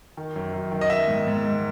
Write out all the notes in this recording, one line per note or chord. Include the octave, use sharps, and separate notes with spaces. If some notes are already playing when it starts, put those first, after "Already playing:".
D#3
F#2
F#2
D#3
D#5
D#3 E5
G#2
G#2
G#2